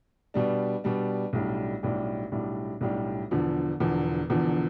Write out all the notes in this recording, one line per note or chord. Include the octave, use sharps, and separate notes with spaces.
B2 G3 D4
B2 G3 D4
B1 A2 G3 D4 G4
B1 A2 G3 D4 G4
B1 A2 G3 D4 G4
B1 A2 G3 D4 G4
E1 E2 D3 F3
E1 E2 D3 F3
E1 E2 D3 F3